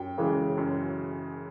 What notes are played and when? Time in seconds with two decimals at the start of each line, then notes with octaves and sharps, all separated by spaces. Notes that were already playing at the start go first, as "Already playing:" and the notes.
Already playing: F#2 G5
0.18 C#3 E3 G#3
0.58 F#2